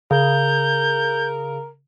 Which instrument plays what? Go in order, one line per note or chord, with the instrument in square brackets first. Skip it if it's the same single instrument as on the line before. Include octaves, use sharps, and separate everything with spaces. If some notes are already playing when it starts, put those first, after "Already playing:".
[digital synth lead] C#3 [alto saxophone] A#4 [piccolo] G6